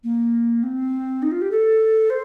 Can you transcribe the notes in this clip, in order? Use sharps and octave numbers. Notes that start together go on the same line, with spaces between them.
A#3
C4
D#4
F4
G4
A4
C5